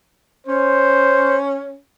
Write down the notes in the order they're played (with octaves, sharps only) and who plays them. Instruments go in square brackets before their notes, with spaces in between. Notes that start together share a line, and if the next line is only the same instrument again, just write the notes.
[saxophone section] C#4 [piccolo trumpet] C5